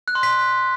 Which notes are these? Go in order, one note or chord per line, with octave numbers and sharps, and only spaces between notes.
F#6
C6
B6